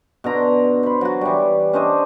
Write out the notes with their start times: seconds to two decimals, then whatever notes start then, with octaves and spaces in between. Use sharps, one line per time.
0.24 B2 D3 A#5 C6
0.83 C5 B5
1.01 F#3 F#4
1.21 E3 G3
1.73 C#4 D4 C5 D#5